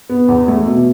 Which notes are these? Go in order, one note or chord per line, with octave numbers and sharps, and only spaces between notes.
B3
E2
A3
B2